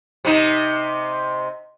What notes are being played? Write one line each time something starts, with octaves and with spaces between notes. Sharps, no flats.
C3 D#4